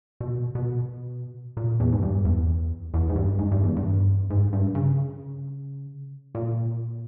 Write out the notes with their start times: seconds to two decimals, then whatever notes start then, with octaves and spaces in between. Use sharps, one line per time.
0.20 B2
0.55 B2
1.57 A#2
1.80 E2
1.92 G#2
2.03 G2
2.25 E2
2.94 E2
3.09 G#2
3.16 G2
3.39 G#2
3.51 G2
3.63 E2
3.76 G2
4.30 G#2
4.53 G2
4.75 C#3
6.35 A#2